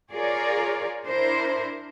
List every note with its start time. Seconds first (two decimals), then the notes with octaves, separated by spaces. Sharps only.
0.12 F4 G#4 A#4 C#5 D5
1.05 D4 E4 A#4 C5